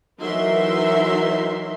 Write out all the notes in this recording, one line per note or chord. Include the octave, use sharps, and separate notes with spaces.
E3 F#3 D#4 A#4 E5 C6